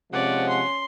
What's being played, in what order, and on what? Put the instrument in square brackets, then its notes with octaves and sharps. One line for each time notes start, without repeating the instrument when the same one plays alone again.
[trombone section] C3 F3 G#3 [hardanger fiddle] C#4 [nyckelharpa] D5 [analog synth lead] F#5
[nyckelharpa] C6